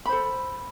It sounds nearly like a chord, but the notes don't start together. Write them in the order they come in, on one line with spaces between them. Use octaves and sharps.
B5 C5 A4